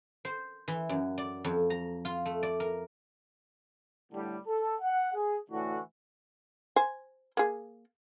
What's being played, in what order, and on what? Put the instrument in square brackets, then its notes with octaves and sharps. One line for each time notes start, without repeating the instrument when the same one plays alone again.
[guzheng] C5
E3
F#2
D5
F2
A#5
F4
A3
D5
A#4
[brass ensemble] A2 D3 G3
A4
F#5
G#4
A2 D3 E3 F#4
[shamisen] C5 G#5
A#3 G#4